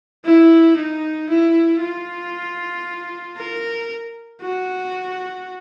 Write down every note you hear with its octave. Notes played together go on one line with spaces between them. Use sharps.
E4
D#4
E4
F4
A#4
F#4